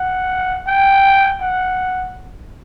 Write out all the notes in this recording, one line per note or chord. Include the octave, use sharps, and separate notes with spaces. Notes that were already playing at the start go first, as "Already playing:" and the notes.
Already playing: F#5
G5
F#5